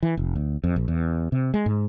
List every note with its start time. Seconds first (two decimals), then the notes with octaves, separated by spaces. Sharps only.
0.03 E3
0.17 F1
0.35 D2
0.64 F2
0.76 A#1
0.88 E2
1.32 C3
1.54 G#3
1.66 G#2